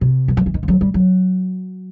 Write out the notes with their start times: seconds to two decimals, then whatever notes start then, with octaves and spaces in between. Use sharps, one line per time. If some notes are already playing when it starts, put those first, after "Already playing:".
0.01 C3
0.28 F#3
0.37 F3
0.46 E3
0.54 D#3
0.63 F3
0.68 F#3
0.81 G3
0.94 F#3